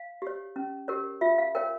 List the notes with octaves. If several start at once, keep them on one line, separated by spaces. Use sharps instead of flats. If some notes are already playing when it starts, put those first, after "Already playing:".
Already playing: F5
G4 C#5
C#4
G4 A#4 C#5
F4 E5
F5
A#4 C#5 G5